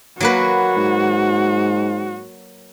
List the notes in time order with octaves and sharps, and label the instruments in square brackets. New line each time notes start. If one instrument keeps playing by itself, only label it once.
[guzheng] F#3 A#3 B4 [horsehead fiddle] F#4
[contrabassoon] G#2